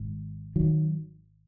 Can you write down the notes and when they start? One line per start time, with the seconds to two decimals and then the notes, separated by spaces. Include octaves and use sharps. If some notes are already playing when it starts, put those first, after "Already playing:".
Already playing: G#1 G#2
0.56 D#3 F#3